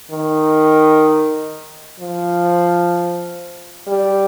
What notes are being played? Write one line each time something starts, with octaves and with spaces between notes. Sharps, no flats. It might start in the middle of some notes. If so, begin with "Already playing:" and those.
D#3
F3
G3